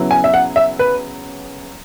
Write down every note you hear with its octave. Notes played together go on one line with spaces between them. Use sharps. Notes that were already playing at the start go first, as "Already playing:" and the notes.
Already playing: C#3 F#3 B3 E4
G#5
E5
F#5
E5
B4